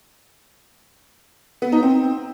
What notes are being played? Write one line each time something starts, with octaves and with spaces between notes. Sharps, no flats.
B3
D#4
C4